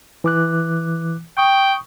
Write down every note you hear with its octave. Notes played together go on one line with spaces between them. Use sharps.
E3 D6 F#6
G5 C#6 D#6